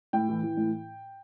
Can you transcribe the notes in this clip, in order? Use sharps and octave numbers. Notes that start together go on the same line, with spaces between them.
A2 G5
E3
E3
A2